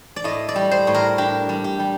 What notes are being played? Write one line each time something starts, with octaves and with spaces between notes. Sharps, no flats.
D5
A2 D#5
D5
G3
C5
A2
A#4
D4 G4
G3
G4
G3